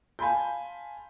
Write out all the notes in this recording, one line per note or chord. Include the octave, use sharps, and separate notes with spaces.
F5 G#5 A5 B5 C6 G6